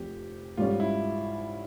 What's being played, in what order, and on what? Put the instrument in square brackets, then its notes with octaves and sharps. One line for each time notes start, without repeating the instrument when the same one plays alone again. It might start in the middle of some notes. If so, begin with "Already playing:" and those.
Already playing: [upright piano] F1 F2 [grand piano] G4
[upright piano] G#2 G3 C#4 [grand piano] F4
[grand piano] E4